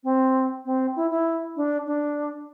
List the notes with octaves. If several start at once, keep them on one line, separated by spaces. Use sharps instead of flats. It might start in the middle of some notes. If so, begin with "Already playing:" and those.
C4
C4
E4
E4
D4
D4